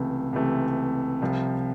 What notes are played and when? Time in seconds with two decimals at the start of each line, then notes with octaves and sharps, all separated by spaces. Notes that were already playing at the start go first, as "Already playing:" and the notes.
Already playing: C#2 C3 E3 A3
0.33 C#2 C3 E3 A3
1.22 C2 C3 F3